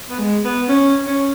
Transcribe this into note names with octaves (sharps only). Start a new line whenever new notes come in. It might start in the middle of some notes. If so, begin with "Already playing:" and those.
B3
G#3
B3
C#4
C#4